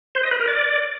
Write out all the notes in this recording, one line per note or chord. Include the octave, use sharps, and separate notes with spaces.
C5
D#5
B4
A#4
D5